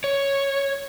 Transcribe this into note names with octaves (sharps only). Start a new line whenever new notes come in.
C#5